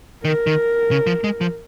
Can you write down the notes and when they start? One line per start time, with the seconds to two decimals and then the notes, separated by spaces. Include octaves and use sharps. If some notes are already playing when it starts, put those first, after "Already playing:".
0.24 D#3 A#4
0.47 D#3
0.91 C#3
1.07 F3
1.24 G#3
1.41 F3